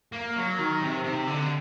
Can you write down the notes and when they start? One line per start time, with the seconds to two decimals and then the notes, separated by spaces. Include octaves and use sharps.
0.12 A#3
0.36 F#3
0.59 D#3
0.82 C3
1.04 C3
1.28 D3